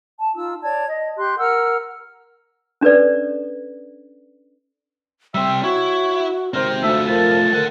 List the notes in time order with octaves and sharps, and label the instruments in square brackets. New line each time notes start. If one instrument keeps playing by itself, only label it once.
[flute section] A5
D#4 F4 E6
C#5 D5 A5 G#6
D#5
G4 C6 F#6
A#4 F#5 E6 F6
[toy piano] C#4 D4 A4 B4 D5
[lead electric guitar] G3 C4 [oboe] E5 [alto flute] G5
[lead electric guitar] E4 [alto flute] F#4 [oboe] C#5
[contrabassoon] G#1 [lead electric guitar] C4 G4 [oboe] A#4 [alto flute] C5
[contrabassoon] D2 [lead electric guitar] A3 F4 [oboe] E5
[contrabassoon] F3 [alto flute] A#4 [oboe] A5
[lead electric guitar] A4 F#5 [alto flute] A#4